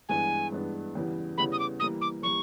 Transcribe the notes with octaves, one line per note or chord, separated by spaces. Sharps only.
G2 E3 G#3 B3 D4 G#5
G2 E3 G#3 B3 D4
E2 C#3 E3 G3 B3
E2 C#3 E3 G3 B3 B5
D#6
D6
E3 G3 A#3 D#6
D6
E3 G3 A#3 C#6